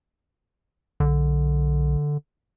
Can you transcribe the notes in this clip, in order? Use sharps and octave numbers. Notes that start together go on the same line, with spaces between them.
B1 D3